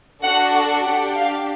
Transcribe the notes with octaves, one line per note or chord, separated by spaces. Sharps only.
D4 F#4 A4 F#5
F#5
D4 G4 F#5
F5